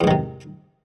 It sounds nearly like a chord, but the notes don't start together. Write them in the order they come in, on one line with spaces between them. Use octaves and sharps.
E2 G#2 D#3 C3